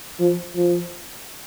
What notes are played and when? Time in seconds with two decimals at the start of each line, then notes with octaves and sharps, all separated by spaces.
0.20 F3
0.55 F3